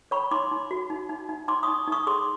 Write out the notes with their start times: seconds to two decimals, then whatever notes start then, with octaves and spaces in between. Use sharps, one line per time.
0.11 C#5 B5 C#6
0.31 D#4 C6 D6
0.51 D#4
0.71 F#4
0.90 D#4
1.09 D#4
1.29 D#4
1.48 D#4 C6 D6
1.63 D#4 C#6 D#6
1.87 D#4 C#6 D#6
2.07 G#4 C6 D6